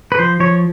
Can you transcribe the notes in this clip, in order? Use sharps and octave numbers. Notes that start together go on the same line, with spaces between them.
B4
F3 C5
F3 C#5